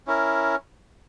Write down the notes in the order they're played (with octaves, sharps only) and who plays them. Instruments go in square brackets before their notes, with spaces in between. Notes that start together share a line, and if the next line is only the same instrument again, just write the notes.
[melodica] C#4 E4 A#4